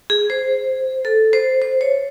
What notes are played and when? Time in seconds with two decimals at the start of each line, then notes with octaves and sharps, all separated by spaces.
0.10 G#4
0.30 C5
1.05 A4
1.33 C5
1.62 C5
1.81 C#5